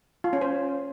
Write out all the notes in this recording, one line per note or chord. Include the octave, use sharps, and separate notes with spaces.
F4
C#4
C5